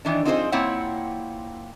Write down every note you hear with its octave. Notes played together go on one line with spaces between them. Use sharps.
D#3 E3 D4
C4 D#4 F4 G#4 B4 C5
A#2 A#3 C4 E4 C#5 F#5